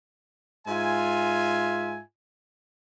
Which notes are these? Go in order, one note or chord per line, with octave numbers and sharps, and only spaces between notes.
G#2 F4 E5 G#5